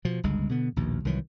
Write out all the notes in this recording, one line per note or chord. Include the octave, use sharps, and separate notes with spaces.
B2 F3
G1 C#2 G2 G#3
B2 D3 B3
A#1 D#2 B2
C2 D#3 E3 F#3